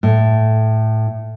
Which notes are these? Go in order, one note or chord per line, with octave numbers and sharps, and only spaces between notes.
A2